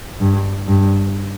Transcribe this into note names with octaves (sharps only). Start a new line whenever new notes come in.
G2
G2